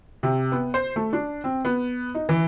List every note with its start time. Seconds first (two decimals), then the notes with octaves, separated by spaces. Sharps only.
0.23 C3
0.52 B3
0.74 C5
0.96 A3
1.13 D4
1.44 C4
1.65 B3
2.15 D#4
2.29 E3